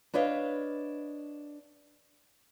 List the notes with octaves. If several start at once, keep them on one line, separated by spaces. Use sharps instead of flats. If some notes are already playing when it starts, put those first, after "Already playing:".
D4 B4 C#5 D#5 F5